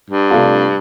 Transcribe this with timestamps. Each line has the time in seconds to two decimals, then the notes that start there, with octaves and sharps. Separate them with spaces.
0.10 G2
0.31 C3 A3 D4 F4